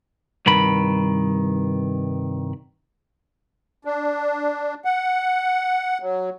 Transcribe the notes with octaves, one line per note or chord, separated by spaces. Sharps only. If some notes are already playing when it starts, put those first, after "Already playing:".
C2 G2 D#3 B5
D4
F#5
F#3